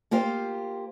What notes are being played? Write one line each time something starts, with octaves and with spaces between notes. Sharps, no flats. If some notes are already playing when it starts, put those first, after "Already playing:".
A#3 F4 G4 C5